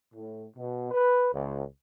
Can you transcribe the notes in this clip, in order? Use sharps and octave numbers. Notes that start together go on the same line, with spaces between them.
A2
B2
B4
C#2